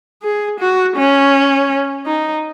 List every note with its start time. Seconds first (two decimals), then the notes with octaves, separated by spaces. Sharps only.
0.23 G#4
0.60 F#4
0.96 C#4
2.06 D#4